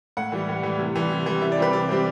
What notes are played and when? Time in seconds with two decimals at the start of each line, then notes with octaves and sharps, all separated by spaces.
0.17 A2 F#5
0.32 E3 G3
0.49 A2
0.63 E3 G3
0.79 C3
0.95 E3 G3
1.11 C3
1.26 E3 G3
1.41 C3 E5
1.52 D5
1.57 E3 G3 C4 B4
1.73 C3 D5
1.89 E3 G3 C4